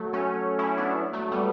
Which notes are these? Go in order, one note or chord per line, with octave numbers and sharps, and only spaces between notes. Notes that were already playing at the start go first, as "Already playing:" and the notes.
Already playing: F#3 A3
A3 C#4
C#4 E4
B3 D4
F#3 A3
G3 B3